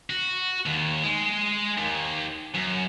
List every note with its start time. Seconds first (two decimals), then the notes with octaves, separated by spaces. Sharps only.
0.10 F#4
0.66 D#2
1.04 G#3
1.78 D#2
2.55 F#2